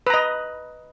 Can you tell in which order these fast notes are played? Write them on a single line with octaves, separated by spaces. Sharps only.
B4 A#5 D#5